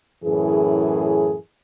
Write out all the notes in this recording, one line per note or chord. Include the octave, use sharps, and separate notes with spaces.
F#2 A2 E3 G#4